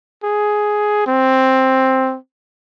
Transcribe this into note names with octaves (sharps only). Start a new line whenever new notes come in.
G#4
C4